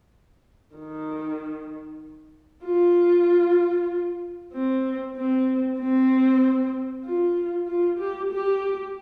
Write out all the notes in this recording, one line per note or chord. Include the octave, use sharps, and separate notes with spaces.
D#3
F4
C4
C4
C4
F4
F4
G4
G4